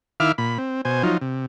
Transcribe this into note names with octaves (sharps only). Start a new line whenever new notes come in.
D#3 E4 E5 F5 D6 F6
A#2 B5
C4
B2 C5 G#5
F3 F#3 D#4 F4
C3